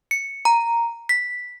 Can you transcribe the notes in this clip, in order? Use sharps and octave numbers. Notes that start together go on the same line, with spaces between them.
C#7
A#5
B6